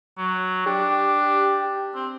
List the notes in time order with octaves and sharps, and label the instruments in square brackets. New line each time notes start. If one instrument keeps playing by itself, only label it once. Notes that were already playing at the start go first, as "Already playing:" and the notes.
[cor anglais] F#3
[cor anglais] D4 [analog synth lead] G4
[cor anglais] C4